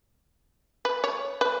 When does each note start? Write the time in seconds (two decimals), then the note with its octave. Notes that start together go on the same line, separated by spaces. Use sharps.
0.85 B4
1.04 C#5
1.41 B4